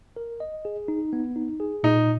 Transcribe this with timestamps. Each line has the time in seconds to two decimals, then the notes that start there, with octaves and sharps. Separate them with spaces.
0.16 A#4
0.40 D#5
0.65 G#4
0.88 D#4
1.13 B3
1.36 D#4
1.60 G#4
1.83 A#2 D#4